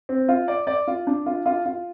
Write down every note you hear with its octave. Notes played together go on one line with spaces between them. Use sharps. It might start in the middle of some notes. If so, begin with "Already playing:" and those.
C4
F4
D5
D5
F4
D4
F4
F4
F4